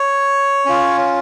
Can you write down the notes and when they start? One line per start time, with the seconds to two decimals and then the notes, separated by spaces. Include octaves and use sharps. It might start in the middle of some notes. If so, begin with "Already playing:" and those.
Already playing: C#5
0.66 C#4 F4